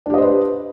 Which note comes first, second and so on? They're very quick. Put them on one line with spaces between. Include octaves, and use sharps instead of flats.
D4 G4 D#5 C5 B4